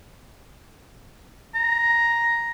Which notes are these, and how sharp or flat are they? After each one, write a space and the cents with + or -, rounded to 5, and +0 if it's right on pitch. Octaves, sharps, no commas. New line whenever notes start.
A#5 +5